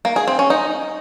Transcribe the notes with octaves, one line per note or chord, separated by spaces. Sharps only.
A#3
G#4
C4
C#4
D#4